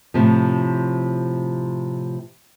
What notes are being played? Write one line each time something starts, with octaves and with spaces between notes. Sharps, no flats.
A2 C3 F3